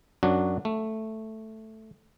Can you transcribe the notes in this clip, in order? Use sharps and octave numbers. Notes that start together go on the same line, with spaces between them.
F#2 F#3 D4 F#4
A3